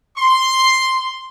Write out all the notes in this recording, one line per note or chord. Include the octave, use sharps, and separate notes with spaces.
C6